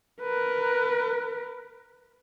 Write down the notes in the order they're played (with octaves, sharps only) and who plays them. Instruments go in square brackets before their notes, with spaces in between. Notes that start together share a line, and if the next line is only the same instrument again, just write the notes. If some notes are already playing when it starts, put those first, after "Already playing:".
[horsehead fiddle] A#4 B4